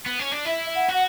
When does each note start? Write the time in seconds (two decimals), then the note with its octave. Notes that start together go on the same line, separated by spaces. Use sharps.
0.06 B3
0.19 C#4
0.32 D4
0.46 E4 E5
0.75 F#5
0.89 F#4 F#5